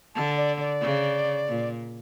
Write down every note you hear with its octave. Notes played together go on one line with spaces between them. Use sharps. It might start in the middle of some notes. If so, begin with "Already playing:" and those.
D3 A5
D5
D5
C#3
A#2